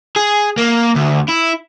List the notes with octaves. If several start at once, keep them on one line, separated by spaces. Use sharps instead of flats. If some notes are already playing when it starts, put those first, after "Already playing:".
G#4
A#3
D2
E4